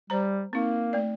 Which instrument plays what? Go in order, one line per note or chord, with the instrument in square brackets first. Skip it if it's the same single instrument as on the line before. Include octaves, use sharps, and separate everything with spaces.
[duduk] G3 [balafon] C5 A#5
[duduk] A#3 [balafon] C4 D#4
[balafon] A3 D5